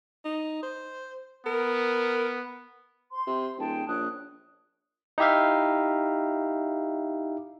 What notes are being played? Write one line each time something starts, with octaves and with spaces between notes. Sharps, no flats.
D#4
C5
B3 A#4
C5 C6
C3
D#1 G#4 G5 A5
A#1 C#5 D#6 F#6
D#4 E4 G4 E5 F5